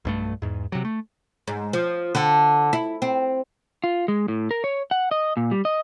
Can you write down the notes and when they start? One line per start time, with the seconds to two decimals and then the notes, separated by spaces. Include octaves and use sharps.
0.05 B1 G2 A3
0.42 E2 G#2
0.72 C3 F#3
0.85 A3
1.48 G#2
1.73 F3
2.15 D3
2.73 E4
3.02 C4
3.84 F4
4.08 G#3
4.28 A2
4.51 A#4
4.64 C#5
4.91 F#5
5.11 D#5
5.37 A#2
5.51 G3
5.65 D#5